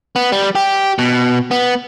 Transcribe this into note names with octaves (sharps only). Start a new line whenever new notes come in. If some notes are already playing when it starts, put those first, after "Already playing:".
B3
G3
G4
B2
B3